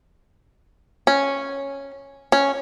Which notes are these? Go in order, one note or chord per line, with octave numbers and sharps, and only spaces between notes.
C#4
C#4